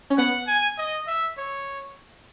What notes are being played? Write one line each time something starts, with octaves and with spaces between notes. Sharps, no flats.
C#4
B3 F#5
G#5
D#5
E5
C#5